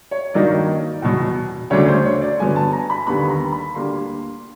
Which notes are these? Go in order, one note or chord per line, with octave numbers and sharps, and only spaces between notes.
C#5
G2 D#3 F#3 A#3 D#4 D5
E2 B2 F#3
D2 C#3 F#3 A3 D4 C#5
C5
C#5
D5
G2 D3 F#3 B3 G#5
A5
A#5
B5
D#2 D3 G3 B3 B5
A#5
B5
D2 D3 G3 A#3 D4 C6